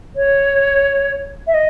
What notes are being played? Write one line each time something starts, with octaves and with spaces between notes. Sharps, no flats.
C#5
E5
D#5